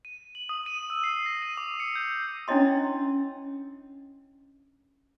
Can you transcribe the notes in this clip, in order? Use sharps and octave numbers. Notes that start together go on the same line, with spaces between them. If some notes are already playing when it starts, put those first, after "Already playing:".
D#7
F#7
D#6
D#7
E6
C7
A#6
D#7
D6
C#7
G6
C#4 D4 E4 C#5 D#5 C6